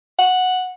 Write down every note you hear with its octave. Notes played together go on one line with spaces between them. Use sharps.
F#5